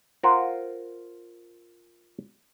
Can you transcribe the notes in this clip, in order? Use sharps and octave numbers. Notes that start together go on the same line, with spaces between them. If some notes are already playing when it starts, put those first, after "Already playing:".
F4 A#4 C5 F#5